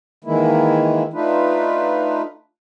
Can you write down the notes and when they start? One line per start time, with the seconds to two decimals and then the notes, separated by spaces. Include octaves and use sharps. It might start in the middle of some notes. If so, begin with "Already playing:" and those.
0.24 D#3 E3 G#3 A#3 E4
1.13 A3 D4 D#4 F4 B4